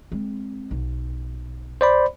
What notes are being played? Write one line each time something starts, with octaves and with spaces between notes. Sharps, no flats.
G#3 C4
B1
C5 D5 B5